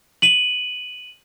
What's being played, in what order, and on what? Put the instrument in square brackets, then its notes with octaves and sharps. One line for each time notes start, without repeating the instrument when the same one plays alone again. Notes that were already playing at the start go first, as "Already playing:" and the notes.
[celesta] D#7 F#7